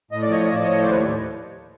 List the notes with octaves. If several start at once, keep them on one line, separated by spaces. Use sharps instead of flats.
A2 D#5
D5
F3 C#5 D#5
F3 D#5
D5
A2 C#5 D#5
D#2 C5 D5
B4 C#5